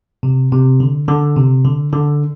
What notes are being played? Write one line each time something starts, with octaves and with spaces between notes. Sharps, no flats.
C3
C3
D3
D3
C3
D3
D3